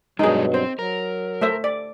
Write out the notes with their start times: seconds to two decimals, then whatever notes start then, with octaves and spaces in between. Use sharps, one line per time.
0.19 G2 B2 F#3 G#3 D4 D#4 G#4
0.54 C4 C5
0.79 F#3 A#4
1.41 A3 C5 E5
1.64 D5